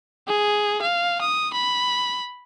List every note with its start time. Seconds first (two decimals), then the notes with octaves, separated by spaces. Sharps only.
0.27 G#4
0.81 F5
1.21 D#6
1.53 B5